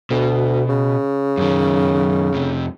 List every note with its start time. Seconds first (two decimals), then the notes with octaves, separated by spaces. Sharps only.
0.11 D2 B2
0.69 C#3
1.38 F#2 D#3
2.34 F2 C3